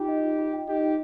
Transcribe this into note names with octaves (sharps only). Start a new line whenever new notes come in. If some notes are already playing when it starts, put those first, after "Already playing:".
Already playing: D#4 F4 G4 G5
D#5
F4
F4
G5
D#4 G4 D#5
F4